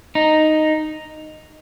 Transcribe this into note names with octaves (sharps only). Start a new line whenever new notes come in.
D#4